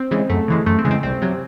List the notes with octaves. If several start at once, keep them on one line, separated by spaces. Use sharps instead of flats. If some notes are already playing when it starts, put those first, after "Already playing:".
Already playing: C4
C#3 E3 G#3
F#2 A3
C#3 E3 G#3
F#2 A3
C4
C#3 E3 G#3
C4
C2 C4
C3 F#3